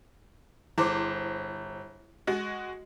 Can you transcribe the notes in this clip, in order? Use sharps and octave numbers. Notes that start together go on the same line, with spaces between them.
G1 E4 G#4 C5 D6
G#3 F#4 D#5